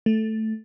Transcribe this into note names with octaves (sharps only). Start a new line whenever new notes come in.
A3